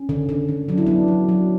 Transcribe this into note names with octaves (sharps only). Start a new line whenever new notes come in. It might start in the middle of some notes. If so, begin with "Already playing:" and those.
Already playing: C#4
D3
D3
D3
F#3 D4
E4
F#3 B3 D4
F#3
F#3